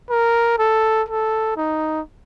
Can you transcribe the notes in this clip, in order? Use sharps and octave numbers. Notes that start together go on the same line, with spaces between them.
A#4
A4
A4
D#4